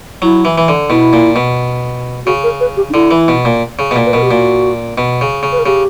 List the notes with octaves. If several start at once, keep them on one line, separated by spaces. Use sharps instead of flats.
F#3 E4
E3
E3
D3
B2 E4
A#2
B2
C#3 F#4
A#4
B4
G4
D4
D3 E4
E3
B2
A#2
C#3
B2
A#2
B4
B2 A#4
G4
A#2 F#4
B2
C#3
C#3
B4
A#4
C#3 G4